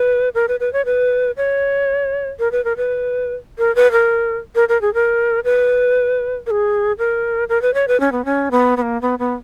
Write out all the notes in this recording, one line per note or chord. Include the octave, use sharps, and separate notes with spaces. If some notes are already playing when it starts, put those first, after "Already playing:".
Already playing: B4
A#4
B4
B4
C#5
B4
C#5
A#4
B4
A#4
B4
A#4
B4
A#4
A#4
A#4
G#4
A#4
B4
A#4
G#4
A#4
A#4
B4
C#5
B4
C#4
B3
C#4
B3
B3
A#3
B3
B3